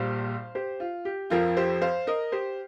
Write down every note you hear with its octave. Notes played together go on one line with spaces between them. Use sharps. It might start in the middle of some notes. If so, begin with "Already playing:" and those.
Already playing: A#1 A#2 G3 C5 F5
G4 C5
F4
G4
F2 F3 C4 F4 A#4
G4 C5
C5 F5
A#4 D#5
G4 C5